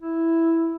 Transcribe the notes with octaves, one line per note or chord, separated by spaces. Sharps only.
E4